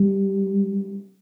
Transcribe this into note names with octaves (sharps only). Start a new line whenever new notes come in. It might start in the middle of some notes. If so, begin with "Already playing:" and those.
Already playing: G3